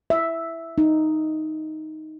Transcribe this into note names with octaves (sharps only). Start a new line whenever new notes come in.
E5
D#4